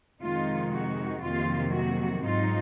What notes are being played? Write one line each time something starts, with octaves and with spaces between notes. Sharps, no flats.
F2 C3 D#3 G#3 D#4 F4
F#4
F2 C3 D#3 F#3 A#3 F4
F#4
G#2 F#3 C4 D#4 F4